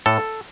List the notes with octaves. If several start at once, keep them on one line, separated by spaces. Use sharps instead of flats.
A2 A4